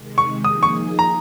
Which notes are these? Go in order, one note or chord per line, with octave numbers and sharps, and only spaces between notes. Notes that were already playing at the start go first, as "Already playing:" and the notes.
Already playing: C3 D#3 G#3
C#6
F3 A#3 D#4 G#4 D#6
C#6
A#5